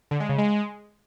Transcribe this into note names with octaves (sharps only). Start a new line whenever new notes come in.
D3
G#3
C#3
G#3